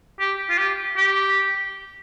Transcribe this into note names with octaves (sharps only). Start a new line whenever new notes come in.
G4
F4
G4
G4